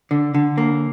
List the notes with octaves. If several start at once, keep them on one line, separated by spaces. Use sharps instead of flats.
D3
D3
A#3